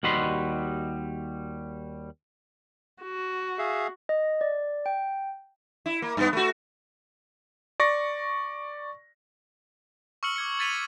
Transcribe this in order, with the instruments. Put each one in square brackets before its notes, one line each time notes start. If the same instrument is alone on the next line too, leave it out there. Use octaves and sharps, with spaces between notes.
[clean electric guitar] D#2 G3 F#4 D#5 B5 C6
[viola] F#4
[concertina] G#4 E5 F5
[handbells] D#5
D5
G5
[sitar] E4
A#3
G2 B3
A3 F#4
[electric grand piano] D5 C#6 A#6
[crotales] C#6 E6 F6 C#7 F#7
D6 G#6 C#7
G#6 A6 B6 D#7 F7 F#7